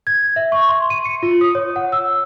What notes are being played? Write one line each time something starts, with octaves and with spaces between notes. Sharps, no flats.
G#6
E5
C#6
C6
D#7
C#7
F4
D#6
C#5
F#5
E6